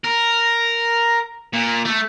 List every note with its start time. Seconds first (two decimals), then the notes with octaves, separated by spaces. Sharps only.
0.04 A#4
1.53 A#2
1.85 A3